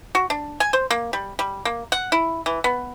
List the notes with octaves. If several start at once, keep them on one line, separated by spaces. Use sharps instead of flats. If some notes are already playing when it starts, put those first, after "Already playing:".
F#4
D4
G#5
C5
A#3
G3
G3
A#3
F#5
E4
E3
B3